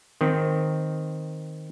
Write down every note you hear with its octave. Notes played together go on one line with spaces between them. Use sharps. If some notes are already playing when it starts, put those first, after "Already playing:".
D#3 C4